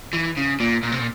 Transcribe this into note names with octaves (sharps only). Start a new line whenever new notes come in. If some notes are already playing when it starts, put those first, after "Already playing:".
E3
C#3
A#2
A#2
C3
A#2